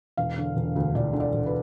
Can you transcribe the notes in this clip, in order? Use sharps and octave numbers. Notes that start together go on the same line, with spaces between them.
E1 F5
D3
E1
D2
E1 D5
D3
D5
E1
B4